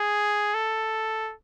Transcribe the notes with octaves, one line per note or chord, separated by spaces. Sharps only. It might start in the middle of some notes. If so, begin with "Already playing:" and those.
Already playing: G#4
A4